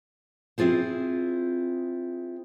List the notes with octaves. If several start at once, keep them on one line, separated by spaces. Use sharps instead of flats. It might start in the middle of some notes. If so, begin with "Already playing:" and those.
C4 E4 F4 G#4 C5